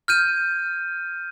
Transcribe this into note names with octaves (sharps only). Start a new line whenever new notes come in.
F6 G6 D#7